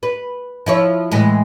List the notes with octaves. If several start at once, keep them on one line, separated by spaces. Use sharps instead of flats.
B4
F3 E4 C#5
A2 E3 G#3